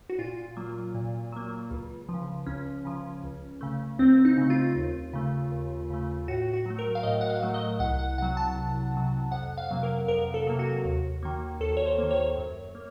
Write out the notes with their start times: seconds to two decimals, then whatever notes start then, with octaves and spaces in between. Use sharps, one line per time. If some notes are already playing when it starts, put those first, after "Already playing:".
0.10 F#4
0.18 A#2 F4
0.57 F#3 A#3
0.94 A#2
1.32 F#3 A#3
1.71 C#2
2.09 F3
2.14 C#3
2.46 C#2 C#4
2.85 C#3 F3
3.23 C#2
3.61 C#3 A3
3.99 C#2 C4
4.25 D#4
4.38 C#3 A3
4.50 F4
4.75 D#2
5.13 C#3 A3
5.52 D#2
5.90 C#3 A3
6.28 A2 F#4
6.53 F#4
6.66 F#3 A3
6.79 A#4
6.95 F5
7.03 A2 D#5
7.21 F#5
7.29 F5
7.42 F#3 A3
7.54 D#5
7.80 C2 F#5
7.99 F#5
8.18 C3 F#3 F#5
8.37 A5
8.56 C2
8.94 C3 F#3
9.32 F2 F#5
9.58 F5
9.71 C3 F#3 A#3
9.83 A#4
10.08 F2 A#4
10.34 A4
10.47 C3 F#3 A#3
10.59 F#4
10.85 D#2
11.23 D#3 A#3
11.60 D#2 A4
11.77 C#5
11.86 C5
11.98 D#3 A#3
12.11 C#5
12.37 F#2
12.75 A#3